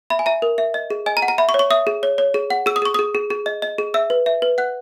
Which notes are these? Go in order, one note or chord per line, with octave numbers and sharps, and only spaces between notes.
E5 B5
G#5
E5 A#5
A#4
E5
D#5
G#4
D#5 G#5
A#5
F#5
A#5
E5 B5
C#6
C#5
C#6
E5 D#6
G#4
C#5
C#5
G#4
F#5
G#4 E6
D#6
G#4 C#6
G#4 D#6
G#4
G#4
D#5
D#5
G#4
E5 E6
B4
E5
B4
F#5 F#6